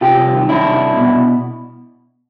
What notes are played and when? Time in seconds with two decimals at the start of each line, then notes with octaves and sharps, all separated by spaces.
0.01 C3 F4 G4
0.17 C2
0.33 D#3
0.49 C2 D4 E4
0.64 C3
0.80 C2
0.96 B2